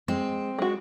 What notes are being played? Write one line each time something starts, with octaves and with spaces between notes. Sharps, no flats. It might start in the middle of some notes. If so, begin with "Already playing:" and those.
G#3 C4
G#3 F#4